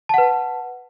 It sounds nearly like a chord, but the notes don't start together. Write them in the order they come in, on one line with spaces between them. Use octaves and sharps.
A5 F#5 B4